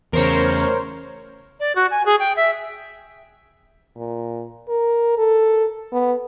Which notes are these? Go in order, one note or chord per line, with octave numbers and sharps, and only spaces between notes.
E2 C#3 A#4 C5 C#5
D5
F#4
G#5
G#4
G5
E5
A#2
A#4
A4
B3